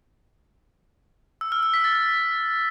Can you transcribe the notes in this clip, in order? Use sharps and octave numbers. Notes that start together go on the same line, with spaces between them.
E6
F6
E6
B6
A6